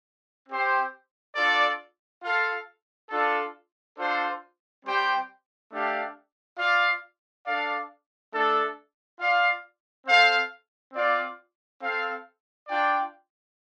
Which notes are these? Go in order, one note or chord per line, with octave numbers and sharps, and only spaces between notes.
C4 G4 C5 G5
D4 F4 A4 D5
F4 A4 F5
D4 F4 A4
D4 F4 A4 C5
G3 C4 G4 C5 G5
A3 D4 G4 F5
F4 D5 F5
D4 A4 D5 F5
A3 D4 A4
F4 D5 F5
C4 A4 C5 F5
C4 F4 D5 F5
C4 A4 F5
D4 F4 D5 G5